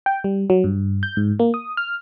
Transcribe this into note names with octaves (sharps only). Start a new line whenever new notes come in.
G5
G3
F#3
G2
G6
G#2
A#3
D#6
F6